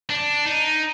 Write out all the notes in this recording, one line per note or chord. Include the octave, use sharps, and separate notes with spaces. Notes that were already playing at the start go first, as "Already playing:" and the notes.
D4
D#4